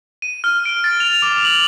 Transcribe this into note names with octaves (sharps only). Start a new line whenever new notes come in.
D#7
F6
D7
A6
F7
D6
F#7